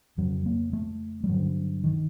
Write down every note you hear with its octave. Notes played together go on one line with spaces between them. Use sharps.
F2 C#3 F#3
A#3
A3
G3
G2 D3 F#3
D#3